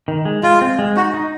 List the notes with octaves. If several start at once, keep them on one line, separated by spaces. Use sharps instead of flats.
D#3
G#3
G#3 F4
C4
G#3
D#4 F#4
D#4